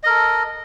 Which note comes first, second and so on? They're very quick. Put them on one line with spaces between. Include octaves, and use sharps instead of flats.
D#5 A#4 A4